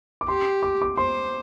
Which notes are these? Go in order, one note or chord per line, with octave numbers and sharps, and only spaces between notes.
D6
G4 C6
D6
D6
C5 C6